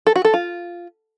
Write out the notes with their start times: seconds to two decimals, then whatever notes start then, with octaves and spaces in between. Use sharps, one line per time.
0.07 A4
0.16 F#4
0.25 A4
0.34 F4